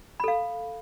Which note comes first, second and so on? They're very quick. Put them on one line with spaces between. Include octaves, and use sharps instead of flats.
B5 A4 F5